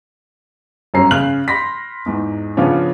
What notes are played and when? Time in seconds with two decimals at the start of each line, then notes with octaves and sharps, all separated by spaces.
0.94 G1 F#2 C#4 A#5 C7
1.11 C#3 F6 F#6 F#7
1.48 B5 C6 A#6 B6
2.06 E2 G#2
2.57 C#3 F3 B3 C#4 D4